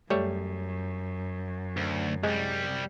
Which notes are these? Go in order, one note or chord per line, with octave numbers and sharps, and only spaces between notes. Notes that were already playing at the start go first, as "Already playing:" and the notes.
F#2 G3 A3 C#5
D2
C2 G3 G#3